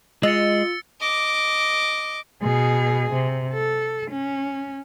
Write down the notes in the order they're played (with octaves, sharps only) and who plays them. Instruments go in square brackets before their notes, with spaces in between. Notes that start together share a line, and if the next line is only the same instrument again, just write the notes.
[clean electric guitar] G#3 [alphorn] F4 [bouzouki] D#5 [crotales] E6 A6 C#7
[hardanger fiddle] D#5 D6
[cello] B2 G#4
C3
A4
C#4